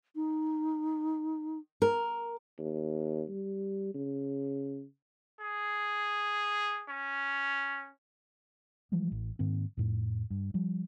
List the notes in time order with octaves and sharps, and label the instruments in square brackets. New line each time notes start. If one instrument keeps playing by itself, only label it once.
[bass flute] D#4
[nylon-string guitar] A#4
[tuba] D#2
G3
C#3
[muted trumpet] G#4
C#4
[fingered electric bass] E3 F3 G3 G#3
A1
G#2 D#3 A#3 C4
F2 A2
G2
F3 G3